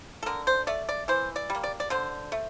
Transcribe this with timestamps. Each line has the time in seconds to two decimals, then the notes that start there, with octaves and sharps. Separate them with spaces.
0.23 A4
0.26 D3 A#4
0.47 C5
0.67 A3 D5
0.89 D5
1.08 E3 C5
1.36 D5
1.50 G3 A#3
1.64 D5
1.80 D5
1.90 D3 C5
2.32 A3